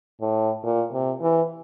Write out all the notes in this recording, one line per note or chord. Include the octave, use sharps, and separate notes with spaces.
A2
A#2
C3
E3